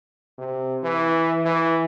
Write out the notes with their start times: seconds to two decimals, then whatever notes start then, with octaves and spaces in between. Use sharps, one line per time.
0.38 C3
0.83 E3
1.45 E3